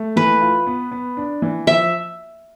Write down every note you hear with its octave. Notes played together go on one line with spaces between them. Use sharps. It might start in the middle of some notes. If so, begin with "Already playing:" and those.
Already playing: A3
E3 B4
F4
B3
B3
D4
E3
F3 E5